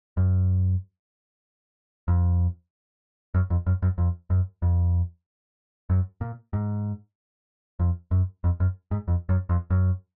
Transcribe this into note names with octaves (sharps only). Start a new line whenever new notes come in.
F#2
F2
F#2
F2
F#2
F#2
F2
F#2
F2
F#2
A#2
G#2
F2
F#2
F2
F#2
G#2
F2
F#2
F2
F#2